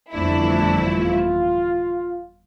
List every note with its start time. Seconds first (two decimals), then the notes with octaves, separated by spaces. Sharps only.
0.13 G1 F2 E3 A3 D4 E4
0.86 F4